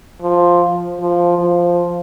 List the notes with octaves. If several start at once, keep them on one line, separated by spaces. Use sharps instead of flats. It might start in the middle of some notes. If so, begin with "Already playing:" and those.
F3
F3
F3